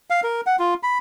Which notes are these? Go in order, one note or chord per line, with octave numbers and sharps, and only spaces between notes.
F5
A#4
F#5
F4
B5